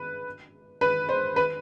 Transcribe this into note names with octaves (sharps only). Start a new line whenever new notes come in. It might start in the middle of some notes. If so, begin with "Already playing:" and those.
Already playing: B4
B4
C5
B4